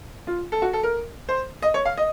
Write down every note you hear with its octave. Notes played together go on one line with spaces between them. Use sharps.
F4
A4
F#4
A4
A#4
C5
D#5
C#5
F5
D#5